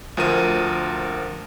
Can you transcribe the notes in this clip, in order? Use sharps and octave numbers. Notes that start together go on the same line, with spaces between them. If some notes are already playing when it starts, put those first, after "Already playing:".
D2 F3 A#4 D#7